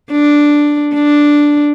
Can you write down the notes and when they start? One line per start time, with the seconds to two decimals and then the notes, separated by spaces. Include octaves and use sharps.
0.11 D4
0.94 D4